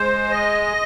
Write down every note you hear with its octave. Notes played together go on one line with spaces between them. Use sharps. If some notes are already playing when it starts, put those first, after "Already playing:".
Already playing: G#3 C5
D#5